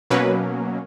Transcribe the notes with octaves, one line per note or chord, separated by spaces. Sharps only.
B2 F#3 A#3 C#4 B4